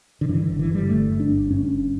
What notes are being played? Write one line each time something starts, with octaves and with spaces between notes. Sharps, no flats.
D3
G2 E3
D3
G1
E3
D3
G3
G1 A3
G2
D4
G1
G2 C#4
G1